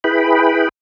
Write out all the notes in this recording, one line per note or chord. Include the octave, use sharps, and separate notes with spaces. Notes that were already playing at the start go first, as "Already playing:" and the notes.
E4 G#4 B4 G5 B5